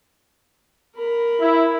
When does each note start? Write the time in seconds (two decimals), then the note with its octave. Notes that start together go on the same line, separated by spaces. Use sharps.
0.95 A#4 B5
1.41 E4